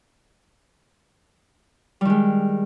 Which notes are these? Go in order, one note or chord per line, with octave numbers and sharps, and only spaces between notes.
D#3 G3 G#3